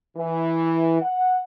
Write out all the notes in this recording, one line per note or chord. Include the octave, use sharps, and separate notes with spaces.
E3
F#5